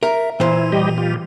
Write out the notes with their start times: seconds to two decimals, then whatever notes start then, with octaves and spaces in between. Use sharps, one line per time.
0.03 A#4 E5
0.40 A#2 E3 E4 C5
0.72 G3 G4 D#5
0.98 F4 G4